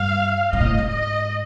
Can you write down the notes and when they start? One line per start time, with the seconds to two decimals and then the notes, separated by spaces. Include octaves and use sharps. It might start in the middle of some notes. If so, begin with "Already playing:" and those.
Already playing: G2 F5
0.53 G#2 D#5
0.61 A#2
0.66 A2
0.78 G#2
0.91 D#5